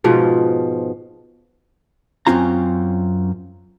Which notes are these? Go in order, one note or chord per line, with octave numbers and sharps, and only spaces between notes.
G#2 B2 F3
F#2 D3 C4 C#4 F4 A#5